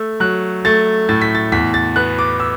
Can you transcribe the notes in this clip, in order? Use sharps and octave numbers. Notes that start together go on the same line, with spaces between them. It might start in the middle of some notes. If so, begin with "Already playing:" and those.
Already playing: A3 E6
F#3 F#6
A3 A6
A2 A6
B6
A6
E2 B6
A6
B3 F#6
D6
E6